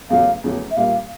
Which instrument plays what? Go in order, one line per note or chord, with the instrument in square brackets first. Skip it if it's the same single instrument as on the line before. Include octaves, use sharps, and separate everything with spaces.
[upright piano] E2 C#3 F#3 A3 [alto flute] F5
[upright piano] E2 C#3 F#3 A3
[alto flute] E5
[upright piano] A#2 G3 A#3 [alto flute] F5